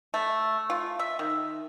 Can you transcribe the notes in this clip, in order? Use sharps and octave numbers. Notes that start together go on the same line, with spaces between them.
A3
F4
E5
D#3